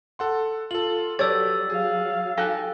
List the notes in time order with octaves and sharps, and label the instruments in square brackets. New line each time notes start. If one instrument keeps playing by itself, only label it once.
[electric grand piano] A4 F#5 C6
[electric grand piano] F4 A4 [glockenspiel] F#7
[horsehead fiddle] F#3 [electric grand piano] G4 A4 B4 [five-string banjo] C#5 D5 [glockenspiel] E6 A6
[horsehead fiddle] F#3 F5 [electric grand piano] G#4
[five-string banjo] D#4 G4 A4 [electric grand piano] G#5 F#6 A#6